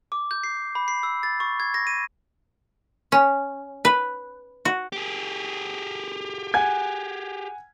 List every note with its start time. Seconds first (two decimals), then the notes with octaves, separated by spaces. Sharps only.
0.12 D6
0.31 G6
0.44 C7
0.75 B5
0.88 C7
1.03 E6
1.23 A6
1.40 C#6
1.60 G#6
1.74 A#6
1.87 D#7
3.12 C#4
3.85 B4
4.65 F#4
4.92 G4 G#4
6.54 F#5 G#5 G#6